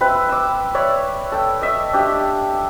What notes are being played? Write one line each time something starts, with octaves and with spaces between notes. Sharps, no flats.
C4 B4 E5
D6 E6
C#5 D5 E5
A4 G5
D#5 E5
D4 G4 E5